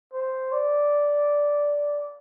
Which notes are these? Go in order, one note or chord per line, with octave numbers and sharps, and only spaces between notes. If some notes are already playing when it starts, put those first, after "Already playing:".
C5
D5